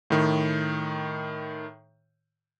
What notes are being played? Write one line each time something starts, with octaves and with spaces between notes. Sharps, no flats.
A2 D#3